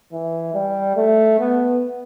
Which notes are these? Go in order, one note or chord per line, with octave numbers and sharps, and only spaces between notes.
E3
G3
A3
B3